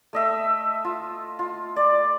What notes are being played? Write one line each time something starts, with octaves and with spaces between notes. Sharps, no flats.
A3 D#5 E5
F4
F4
D5